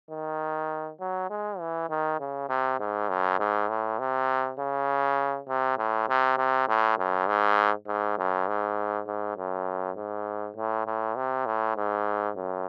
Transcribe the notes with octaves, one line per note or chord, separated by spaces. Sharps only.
D#3
F#3
G#3
E3
D#3
C#3
C3
G#2
F#2
G#2
A2
C3
C#3
C3
A2
C3
C3
A2
F#2
G#2
G#2
F#2
G#2
G#2
F#2
G#2
A2
A2
C3
A2
G#2
F#2